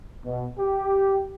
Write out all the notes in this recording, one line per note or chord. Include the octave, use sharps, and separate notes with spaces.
B2
G4